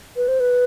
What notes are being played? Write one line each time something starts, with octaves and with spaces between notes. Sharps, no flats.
B4
C5
B4